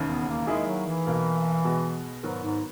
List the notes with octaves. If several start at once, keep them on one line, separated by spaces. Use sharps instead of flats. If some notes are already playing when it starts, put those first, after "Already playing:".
Already playing: E1 D#2 C#3
B3
A#3
D#3 G#3 A#3 E4 G#4
F#3
E3
B1 B2 A#3
B2 G#3 B3 F#4
G#2 D#3 F#3 B3 F#4 A#4
G#2